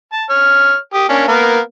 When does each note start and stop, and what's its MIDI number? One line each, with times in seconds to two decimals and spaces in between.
0.13 0.24 81
0.30 0.76 73
0.30 0.76 89
0.94 1.05 67
0.94 1.05 87
1.09 1.24 58
1.09 1.24 61
1.09 1.24 62
1.28 1.59 58
1.28 1.59 59
1.28 1.59 70